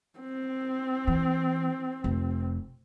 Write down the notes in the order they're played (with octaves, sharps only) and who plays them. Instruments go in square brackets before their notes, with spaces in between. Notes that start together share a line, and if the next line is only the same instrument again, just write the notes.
[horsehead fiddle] C4
[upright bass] E3
F1